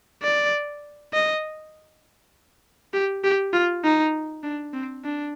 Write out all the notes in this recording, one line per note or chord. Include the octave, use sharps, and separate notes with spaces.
D5
D#5
G4
G4
F4
D#4
D4
C4
D4